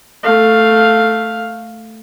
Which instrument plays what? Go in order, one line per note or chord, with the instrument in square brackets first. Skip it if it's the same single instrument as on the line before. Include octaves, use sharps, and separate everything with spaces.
[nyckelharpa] A3 F5